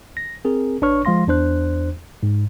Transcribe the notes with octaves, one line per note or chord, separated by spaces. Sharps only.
A#6
C4 G#4 A#4
A1 D4 B4 C#5 C#6 F6
F3 G#3 F5 C6 A#6
E2 D4 C5 F#6
G#2